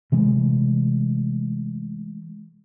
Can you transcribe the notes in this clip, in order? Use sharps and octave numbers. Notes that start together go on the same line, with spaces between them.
C3 E3 G#3 A3